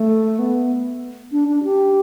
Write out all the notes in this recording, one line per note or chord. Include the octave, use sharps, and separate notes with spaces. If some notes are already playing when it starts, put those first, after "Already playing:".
Already playing: A3
B3
D4
D4
G4